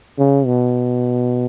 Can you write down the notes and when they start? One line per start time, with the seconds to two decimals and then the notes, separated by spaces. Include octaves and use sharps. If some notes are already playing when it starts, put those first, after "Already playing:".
0.18 C#3
0.46 B2